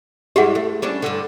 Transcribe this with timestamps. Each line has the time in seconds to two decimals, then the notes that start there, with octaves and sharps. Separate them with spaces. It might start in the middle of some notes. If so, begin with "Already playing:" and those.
0.36 G2 G#3 E4 G4 G#4 F#5
0.55 A3
0.82 G3 C#4 D4
1.02 G2 D3